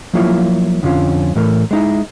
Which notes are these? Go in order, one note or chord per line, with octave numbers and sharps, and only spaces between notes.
F3 F#3 A#3 E4 F4 C#5
F2 D3 F3 C#4 F4
A2 E3 A3 A#4
G#3 D#4 E4